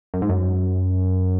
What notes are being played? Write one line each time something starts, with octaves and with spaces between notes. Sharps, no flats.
F#2
G#2
F#2